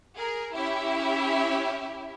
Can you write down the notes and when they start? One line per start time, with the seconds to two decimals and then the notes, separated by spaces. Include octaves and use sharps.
0.15 G#4 A#4
0.55 C#4 E4 G4 E5